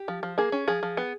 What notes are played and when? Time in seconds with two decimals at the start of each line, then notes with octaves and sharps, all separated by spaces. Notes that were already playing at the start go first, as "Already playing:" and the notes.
Already playing: G4
0.08 F3
0.23 F3
0.38 A#3 G#4
0.52 C#4
0.68 F3 G#4
0.83 F3
0.97 B3